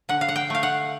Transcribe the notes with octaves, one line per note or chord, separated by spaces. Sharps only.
D3 F#5
F5
F#5
G5
A3 F5
F#5